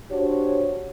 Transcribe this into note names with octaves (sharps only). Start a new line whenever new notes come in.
D4 F#4 G4 C5 C#5